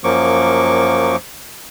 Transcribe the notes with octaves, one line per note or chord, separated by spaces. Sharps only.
F#2 F3 F#3 A#3 C#6 D6